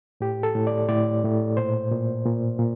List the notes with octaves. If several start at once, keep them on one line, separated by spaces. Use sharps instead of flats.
A2 G4
A4
A2
D5
A2 D5
A2
A#2 C5
A#2
A#2
A#2